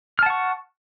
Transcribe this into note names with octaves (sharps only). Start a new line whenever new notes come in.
F#5 A5 C#6 F6